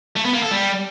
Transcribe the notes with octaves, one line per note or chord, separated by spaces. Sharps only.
A3
B3
A#3
A4
G3